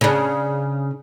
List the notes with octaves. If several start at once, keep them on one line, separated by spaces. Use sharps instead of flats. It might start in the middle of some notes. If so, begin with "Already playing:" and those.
C#3 D4